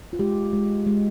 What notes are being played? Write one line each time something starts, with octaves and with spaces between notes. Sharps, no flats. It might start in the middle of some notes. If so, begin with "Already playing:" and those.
F4
G#3 G4
G#3
G#3